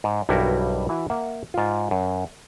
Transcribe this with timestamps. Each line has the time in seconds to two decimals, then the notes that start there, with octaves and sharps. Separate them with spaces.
0.04 G#2
0.29 B1 G2 G3 E4 F#4 A#4
0.89 E3 E4 F#4
1.10 A#3 E5 F#5
1.54 G#2 F4
1.91 F#2